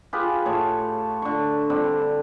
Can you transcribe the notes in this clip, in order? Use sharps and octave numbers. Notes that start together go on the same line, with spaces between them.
F4 G4 G#4 B4
A2 C#5 A5
D3 C#6
D3 G3 C4